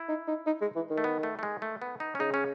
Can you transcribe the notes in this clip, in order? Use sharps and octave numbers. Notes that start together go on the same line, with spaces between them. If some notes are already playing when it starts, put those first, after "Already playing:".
Already playing: E4
D#4
D#4
D#4
G#3
E3
D#3
A3
B3
A3
A3
G#3
A3
B3
D#4
C#4
C#3 D#4
C#4